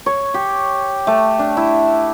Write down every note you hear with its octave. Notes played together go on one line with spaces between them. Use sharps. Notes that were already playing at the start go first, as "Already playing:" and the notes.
C#5
G4
A3
D4
E4